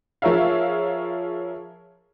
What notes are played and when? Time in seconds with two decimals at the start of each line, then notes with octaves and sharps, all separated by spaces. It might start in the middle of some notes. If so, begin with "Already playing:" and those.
0.22 F3 G#4 A#4 C#5 E5 F5